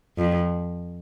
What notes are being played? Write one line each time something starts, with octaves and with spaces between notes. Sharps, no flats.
F2